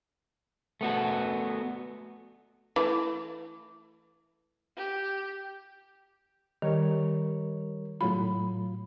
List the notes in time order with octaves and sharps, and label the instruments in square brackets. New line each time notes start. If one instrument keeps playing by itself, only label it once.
[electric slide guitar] A3 B3 F#4
[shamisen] E3 A3
[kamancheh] G4
[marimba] D#3 [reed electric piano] G3 A#4 C#5
[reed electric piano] A2 F#3 F4 [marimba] B5